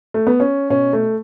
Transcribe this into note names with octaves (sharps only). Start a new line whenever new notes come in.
A3
B3
C#4
B2 C#4
A3